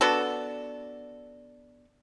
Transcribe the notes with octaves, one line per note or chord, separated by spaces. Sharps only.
B3 D4 F#4 A4